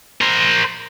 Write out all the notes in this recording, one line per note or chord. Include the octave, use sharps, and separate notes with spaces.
A#4 C5